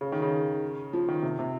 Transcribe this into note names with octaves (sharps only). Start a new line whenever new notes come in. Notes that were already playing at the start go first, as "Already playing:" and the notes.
C#3
D#3
C#3
F3
D#3
C3
C3